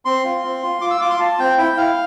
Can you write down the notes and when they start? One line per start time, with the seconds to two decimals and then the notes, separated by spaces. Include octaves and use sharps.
0.05 C4 C6
0.24 F4
0.44 C4
0.63 F4
0.81 F4 D6
0.91 E6
1.01 F4 D6
1.10 C6
1.20 F4 A5
1.39 C4 G5
1.58 E4 G5
1.77 E4 F5